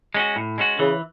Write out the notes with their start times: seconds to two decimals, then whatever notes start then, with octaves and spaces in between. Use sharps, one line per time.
0.14 G#3 C#4 F#4
0.36 A2
0.58 G#3 C#4 F#4
0.79 C#3 E3